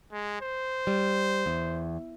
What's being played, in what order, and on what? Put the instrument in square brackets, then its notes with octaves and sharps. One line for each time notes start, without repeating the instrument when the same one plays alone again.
[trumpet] G#3
C5
[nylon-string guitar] G3
E2